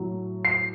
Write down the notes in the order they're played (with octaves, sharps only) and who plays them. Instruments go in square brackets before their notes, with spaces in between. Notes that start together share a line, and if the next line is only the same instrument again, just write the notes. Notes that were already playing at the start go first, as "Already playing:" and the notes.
Already playing: [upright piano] A2 F#3
C7